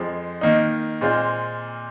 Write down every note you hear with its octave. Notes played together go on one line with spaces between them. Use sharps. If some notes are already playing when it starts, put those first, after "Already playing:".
Already playing: F2 F3 G#3
D#3 A#3 D#4
A#2 G#3 C4 F4 C5